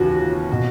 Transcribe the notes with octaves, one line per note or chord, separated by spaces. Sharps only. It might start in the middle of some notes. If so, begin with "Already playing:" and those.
Already playing: D#2 C#3 E3 F4 F#4
B2